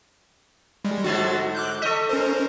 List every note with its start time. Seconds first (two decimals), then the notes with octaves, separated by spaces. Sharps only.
0.85 G3 G#3
1.04 G#2 D3 F#3 F#4 A6
1.55 D6 F#6 G6
1.82 A4 D#5 C#6 B6
2.09 C#4 A#4 C5